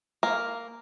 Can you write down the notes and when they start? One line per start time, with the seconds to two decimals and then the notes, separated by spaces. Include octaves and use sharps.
0.23 A#3